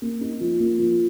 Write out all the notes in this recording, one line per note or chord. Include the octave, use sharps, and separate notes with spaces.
A#3
D#4
F3
A#3
F3